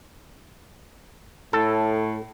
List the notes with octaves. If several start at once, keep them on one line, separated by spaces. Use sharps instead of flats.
A2 A4